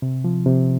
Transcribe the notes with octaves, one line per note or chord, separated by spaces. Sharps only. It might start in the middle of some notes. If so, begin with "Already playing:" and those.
C3
F3
C3